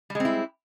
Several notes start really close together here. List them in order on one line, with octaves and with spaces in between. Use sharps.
G3 G#3 C4 E4